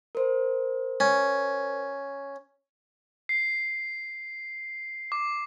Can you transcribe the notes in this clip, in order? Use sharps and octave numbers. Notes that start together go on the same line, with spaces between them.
A#4 C5
C#4
C7
D6